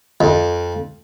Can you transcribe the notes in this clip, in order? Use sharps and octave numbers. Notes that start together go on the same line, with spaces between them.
F2